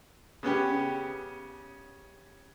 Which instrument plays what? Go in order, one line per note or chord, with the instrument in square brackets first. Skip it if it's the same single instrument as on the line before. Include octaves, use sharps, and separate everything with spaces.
[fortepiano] C#3 B3 C#4 G4